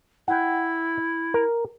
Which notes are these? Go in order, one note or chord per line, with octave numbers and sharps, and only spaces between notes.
E4 F#5 G5
A#4